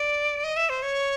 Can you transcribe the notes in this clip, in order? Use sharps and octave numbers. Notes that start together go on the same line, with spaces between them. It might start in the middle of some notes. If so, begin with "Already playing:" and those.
Already playing: D5
D#5
E5
C5
C#5